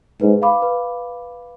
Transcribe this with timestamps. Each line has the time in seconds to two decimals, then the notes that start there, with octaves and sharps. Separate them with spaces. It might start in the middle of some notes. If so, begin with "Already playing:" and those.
0.21 G#2 B4
0.42 F5 B5 D6
0.62 B4